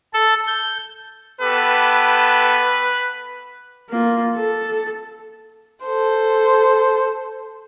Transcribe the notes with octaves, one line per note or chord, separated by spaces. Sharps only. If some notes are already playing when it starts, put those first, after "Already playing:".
A4
G6
B3 G4 A4 B4
A#3 F4
A4
A4 C5